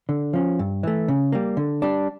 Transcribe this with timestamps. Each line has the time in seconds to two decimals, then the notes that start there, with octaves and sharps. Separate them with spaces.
0.09 D3
0.33 F3 C#4
0.59 G2
0.83 E3 A3
1.08 C#3
1.32 G3 A#3
1.57 D3
1.82 G3 D4